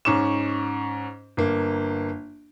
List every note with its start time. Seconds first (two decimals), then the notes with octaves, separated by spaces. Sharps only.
0.05 G#2 C#4 C#6 D6 E7
1.37 G1 A#3